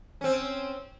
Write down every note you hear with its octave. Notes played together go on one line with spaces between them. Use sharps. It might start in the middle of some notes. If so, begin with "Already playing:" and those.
C4 C#4